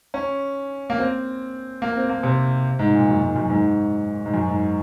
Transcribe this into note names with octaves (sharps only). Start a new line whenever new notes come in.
C#4
A#3
C4
A#3
C4
A#3
C3
G#2
A#2
F#2
G#2
F#2
G#2
G#2
F#2
G#2